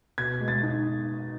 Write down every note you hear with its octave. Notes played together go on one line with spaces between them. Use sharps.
B2 G#6
G#3
A6
D#4